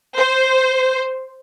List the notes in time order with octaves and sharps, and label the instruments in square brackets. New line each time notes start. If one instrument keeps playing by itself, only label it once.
[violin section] C5